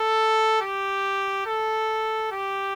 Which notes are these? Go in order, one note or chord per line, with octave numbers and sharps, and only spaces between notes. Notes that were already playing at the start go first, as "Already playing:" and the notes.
Already playing: A4
G4
A4
G4